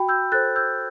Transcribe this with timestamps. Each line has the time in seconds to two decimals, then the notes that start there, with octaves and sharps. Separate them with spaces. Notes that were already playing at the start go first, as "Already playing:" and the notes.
Already playing: F#4 G5 B5
0.09 E6 G6
0.32 A4 C5 F#6 A6
0.56 E6 G6